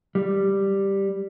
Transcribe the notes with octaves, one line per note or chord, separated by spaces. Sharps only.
G3